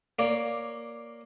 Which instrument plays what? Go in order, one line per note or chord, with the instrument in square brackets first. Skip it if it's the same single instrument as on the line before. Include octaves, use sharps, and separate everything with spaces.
[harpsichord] A#3 C#5 D5